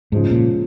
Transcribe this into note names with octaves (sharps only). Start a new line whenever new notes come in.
G#2 C#3 F3 G#3
A#2